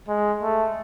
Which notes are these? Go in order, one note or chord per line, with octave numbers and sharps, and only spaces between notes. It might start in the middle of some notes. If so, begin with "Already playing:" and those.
G#3
A3